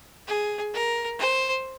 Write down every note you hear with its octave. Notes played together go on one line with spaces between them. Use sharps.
G#4
A#4
C5